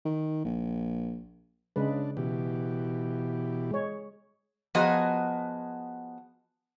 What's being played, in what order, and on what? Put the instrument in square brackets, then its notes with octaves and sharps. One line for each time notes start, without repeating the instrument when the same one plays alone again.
[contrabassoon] D#3
A#1
[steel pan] C#3 G#3 B4 [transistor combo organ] D4
[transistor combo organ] B2 E3 G4
[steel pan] G#3 C#5
[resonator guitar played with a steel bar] F3 B3 F#4 G#4 D#5 A#5